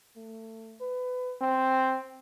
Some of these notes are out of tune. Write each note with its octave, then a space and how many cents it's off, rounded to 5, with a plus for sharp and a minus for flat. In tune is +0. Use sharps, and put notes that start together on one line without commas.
A3 +25
B4 +25
C4 +0